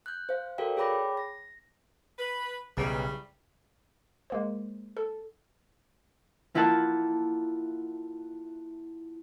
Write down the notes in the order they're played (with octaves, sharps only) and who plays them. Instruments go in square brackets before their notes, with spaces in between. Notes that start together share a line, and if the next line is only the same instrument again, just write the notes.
[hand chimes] F#6 G6
C5 F5
F#4 A4 A#4 D5 F5 G5
G#4 C#5 G5 B5 D6 A#6
A#6
[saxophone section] B4
[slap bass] B1 [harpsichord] C#3 [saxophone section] E3 G3
[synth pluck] G#3 A#3 C5
A4
[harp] A#3 E4 F4 A#4 F#5 A5